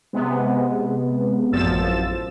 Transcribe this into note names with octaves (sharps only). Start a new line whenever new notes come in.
C3 G#3 B3
A1 F#2 F3 E6 A6 E7